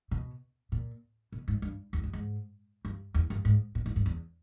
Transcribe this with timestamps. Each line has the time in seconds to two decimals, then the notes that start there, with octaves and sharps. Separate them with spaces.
0.11 B2
0.72 A#2
1.32 B2
1.48 G#2
1.62 G2
1.93 E2
2.03 G2
2.13 G#2
2.85 G2
3.14 E2
3.30 G2
3.45 G#2
3.75 A#2
3.86 G#2
3.96 G2
4.06 E2